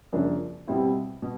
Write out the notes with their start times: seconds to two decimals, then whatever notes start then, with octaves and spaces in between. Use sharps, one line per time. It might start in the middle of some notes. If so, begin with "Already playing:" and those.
0.13 F#2 C#3 F3 A#3 D4
0.67 B2 G3 C4 E4
1.22 B2